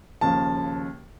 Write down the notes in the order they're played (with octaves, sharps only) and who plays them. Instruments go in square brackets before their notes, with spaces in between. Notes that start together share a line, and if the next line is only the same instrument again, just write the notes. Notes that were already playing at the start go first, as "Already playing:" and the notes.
[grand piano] D#2 C#3 F3 A5